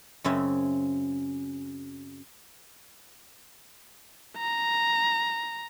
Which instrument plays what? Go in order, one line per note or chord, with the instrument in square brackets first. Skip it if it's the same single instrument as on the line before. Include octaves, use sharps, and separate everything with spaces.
[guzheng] F#2 C#3 C4 C#4 E5
[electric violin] A#5